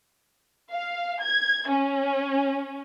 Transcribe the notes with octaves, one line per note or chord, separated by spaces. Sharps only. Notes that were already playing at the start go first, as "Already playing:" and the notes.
F5
G#6
C#4